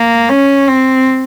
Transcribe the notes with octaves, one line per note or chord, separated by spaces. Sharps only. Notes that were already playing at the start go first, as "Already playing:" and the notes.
Already playing: A#3
C#4
C4